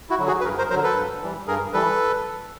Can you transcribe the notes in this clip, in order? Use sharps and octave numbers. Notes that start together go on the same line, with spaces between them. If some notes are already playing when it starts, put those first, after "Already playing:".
E4 F#4
D3 F#3
F#4 G#4
B4
G2 G#4 A#4
A#4 C5
D3 F#3 A#4 C5
A4 B4
G2
E3 G3
G2 G#4 A#4
E3 G3 A4 B4